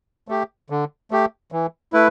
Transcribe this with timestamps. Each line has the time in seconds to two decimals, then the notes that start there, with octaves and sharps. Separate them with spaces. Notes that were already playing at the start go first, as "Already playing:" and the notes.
0.28 A3 G4
0.70 D3
1.11 A3 G4
1.52 E3
1.93 A3 E4 B4